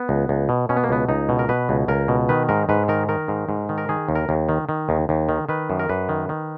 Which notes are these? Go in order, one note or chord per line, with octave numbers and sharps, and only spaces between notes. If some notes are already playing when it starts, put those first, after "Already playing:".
Already playing: B3
C#2
C#2
B2
B2 C#4
B3
A#3
C#2 B3
C#2 D#4
B2
A#4
B2 B4
C#2
C#2 A#4
B2
D#3 B4
G#2 A#4
G#2 B4
D#3 A#4
D#3 A#4
G#2
G#2
D#3
A#4
D#3 G#4
D#2
A#4
D#2
D#3
D#3
D#2
D#2
D#3
D#3 B4
F#2
A#4
F#2 B4
D#3
D#3